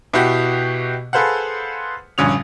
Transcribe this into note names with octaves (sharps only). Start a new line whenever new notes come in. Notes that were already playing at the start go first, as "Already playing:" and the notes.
B2 E4 F#4 G4
G#4 A4 B4 C5 F5 F#5
A#1 G2 D3 C#4 D#6 F7